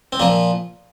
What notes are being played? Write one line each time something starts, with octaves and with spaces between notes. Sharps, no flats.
C4
A#2 F3 A#3